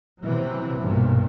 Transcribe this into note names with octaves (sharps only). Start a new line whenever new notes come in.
C3 E3 F#3
B1 G2 A#2